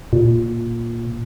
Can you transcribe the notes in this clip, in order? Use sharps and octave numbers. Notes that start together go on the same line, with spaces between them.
A#2